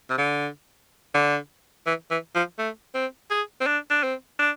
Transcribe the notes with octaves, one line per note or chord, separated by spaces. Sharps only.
C3
D3
D3
E3
E3
F3
A3
C4
G#4
C4
D4
D4
C4
D4